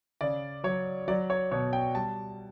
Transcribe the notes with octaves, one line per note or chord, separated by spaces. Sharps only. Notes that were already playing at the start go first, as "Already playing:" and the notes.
C#3 D5
F#3 C#5
F#3 D5
C#5
B2 C#5
G5
G3 A5